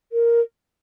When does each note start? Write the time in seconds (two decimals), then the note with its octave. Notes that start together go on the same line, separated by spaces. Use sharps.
0.12 A#4